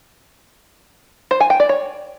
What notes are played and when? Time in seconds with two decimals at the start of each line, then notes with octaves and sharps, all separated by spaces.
1.31 C5
1.40 G#5
1.50 G5
1.60 D5
1.69 C#5